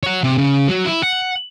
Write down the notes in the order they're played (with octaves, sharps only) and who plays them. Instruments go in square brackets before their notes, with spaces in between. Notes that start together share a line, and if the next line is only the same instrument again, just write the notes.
[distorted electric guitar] C#5 F#5
C3
C#3
F#3 F#4
E4
F#5